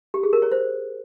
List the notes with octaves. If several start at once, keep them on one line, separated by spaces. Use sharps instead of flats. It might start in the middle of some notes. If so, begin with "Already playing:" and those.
G4
G#4
A#4
C#5
C5